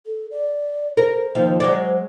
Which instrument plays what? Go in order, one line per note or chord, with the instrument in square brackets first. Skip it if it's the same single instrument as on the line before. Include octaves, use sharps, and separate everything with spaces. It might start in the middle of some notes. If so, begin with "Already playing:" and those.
[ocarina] A4
D5
[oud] A#4 [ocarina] C5
[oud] D#2 F3
F#3 G#3 D5